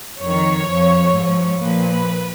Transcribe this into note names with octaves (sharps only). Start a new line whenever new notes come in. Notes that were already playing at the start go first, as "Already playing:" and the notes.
F2 D#3 C#5
F2 F3
G#2 F3
A#2 F3 B4